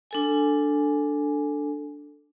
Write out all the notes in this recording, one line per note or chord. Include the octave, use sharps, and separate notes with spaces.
D4 A4 G#5